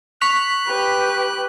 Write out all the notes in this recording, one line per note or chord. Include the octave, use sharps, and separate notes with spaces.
C#6 F#6 B6 F7
G4 B4